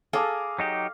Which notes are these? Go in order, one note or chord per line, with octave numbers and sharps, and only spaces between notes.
G#4 A4 F5 A#5 D6
F#3 D#4 G4